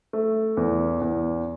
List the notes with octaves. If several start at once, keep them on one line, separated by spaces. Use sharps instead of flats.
A3
E2
E2